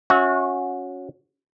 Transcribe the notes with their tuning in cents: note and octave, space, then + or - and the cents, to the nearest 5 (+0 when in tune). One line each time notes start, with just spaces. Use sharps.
C#4 +0 F#4 -25 E5 -25